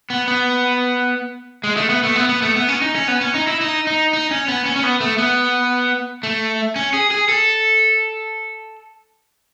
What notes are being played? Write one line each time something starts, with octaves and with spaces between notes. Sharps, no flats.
B3
B3
G#3
A3
B3
A3
B3
B3
A3
B3
C#4
D#4
C#4
B3
C#4
D#4
E4
D#4
D#4
D#4
C#4
B3
C#4
C#4
B3
A3
B3
A3
C#4
G#4
G#4
A4